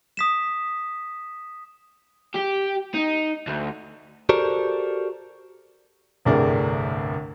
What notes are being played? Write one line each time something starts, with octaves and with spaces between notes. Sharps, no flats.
D#6 B6 E7
G4
D#4
D2
F#4 G4 A4 A#4 C5 D5
G1 C2 A2 D4 G#4 A#4